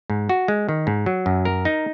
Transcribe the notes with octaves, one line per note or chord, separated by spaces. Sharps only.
G#2
F#4
G#3
D#3
G#2
F#3
F#2
A#4
D#4